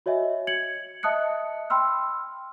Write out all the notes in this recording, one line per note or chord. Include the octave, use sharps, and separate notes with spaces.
F#4 C#5 D#5 E5 G#5
G#6 C#7 F#7
D#5 E5 A5 D#6 F#6 C#7
G5 B5 C6 E6 F6